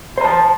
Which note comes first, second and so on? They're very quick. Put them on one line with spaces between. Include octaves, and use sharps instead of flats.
C5 A#5 A5